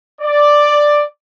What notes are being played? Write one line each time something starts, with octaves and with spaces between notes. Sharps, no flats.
D5